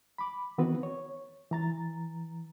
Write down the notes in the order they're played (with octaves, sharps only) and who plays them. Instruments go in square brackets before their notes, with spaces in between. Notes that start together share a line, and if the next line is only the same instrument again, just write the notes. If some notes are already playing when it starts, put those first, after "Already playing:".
[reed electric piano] B5 D6
D#3 E3 B3 C4 F#4 B4
C#5
E3 A#5 A6